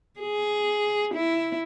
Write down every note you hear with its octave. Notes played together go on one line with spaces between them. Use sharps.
G#4
E4